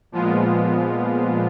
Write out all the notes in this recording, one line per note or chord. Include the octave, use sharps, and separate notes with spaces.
A#2 F3 G#3 B3 F4